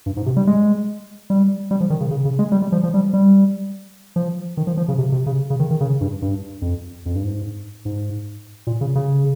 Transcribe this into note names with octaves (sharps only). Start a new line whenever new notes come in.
G2
G#2
C3
G3
G#3
G3
G3
F3
D#3
C#3
C#3
C#3
G#3
G3
G3
F3
F3
G3
G3
F3
D#3
F3
F3
C#3
C3
C3
C#3
C#3
D#3
D#3
C#3
G2
G2
F2
F2
G2
G#2
G#2
A#2
C#3
C#3